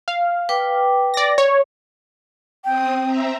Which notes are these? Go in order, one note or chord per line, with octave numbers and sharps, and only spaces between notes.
F5
B4 G5 D6
D5 A#6
C#5
C4 G5 D#6
C4 E5 A#5